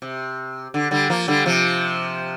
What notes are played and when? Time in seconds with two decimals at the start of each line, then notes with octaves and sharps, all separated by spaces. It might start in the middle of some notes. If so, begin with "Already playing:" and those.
0.02 C3
0.74 D3
0.91 D3 G3
1.10 F3 A#3
1.28 D3 G3
1.46 C3 F3